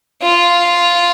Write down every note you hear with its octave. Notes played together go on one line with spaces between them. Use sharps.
F4